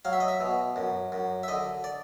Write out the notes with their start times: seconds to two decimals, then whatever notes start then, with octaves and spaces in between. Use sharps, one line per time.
0.05 F#3 F5
0.13 E5
0.20 D#5
0.28 E5
0.40 B2
0.76 F#2
1.12 F#2
1.43 E5
1.48 D3 D#5
1.84 D5